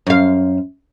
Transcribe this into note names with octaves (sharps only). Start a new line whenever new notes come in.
F#2 F5